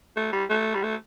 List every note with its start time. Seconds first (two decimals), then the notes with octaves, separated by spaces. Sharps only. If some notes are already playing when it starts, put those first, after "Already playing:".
0.16 A3
0.32 G3
0.49 A3
0.74 G3
0.83 A3